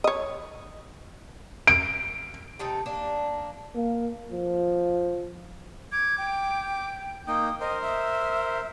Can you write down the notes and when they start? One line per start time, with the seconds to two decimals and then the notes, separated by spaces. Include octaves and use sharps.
0.04 C#5 D#5
1.67 D7
2.59 C3 D#4 A4 G5
2.86 A#3 D4
3.75 A#3
4.32 F3
5.92 D6 G#6
6.18 G5
7.28 A#3 D#4 G5 D#6
7.60 A#4 C5 D#5
7.82 E5